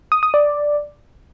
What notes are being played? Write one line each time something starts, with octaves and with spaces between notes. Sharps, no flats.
D#6
D#6
D5